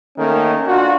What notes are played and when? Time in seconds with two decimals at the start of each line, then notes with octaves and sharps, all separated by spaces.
0.17 D#3 A3 A#3 C#4
0.66 D4 F4 F#4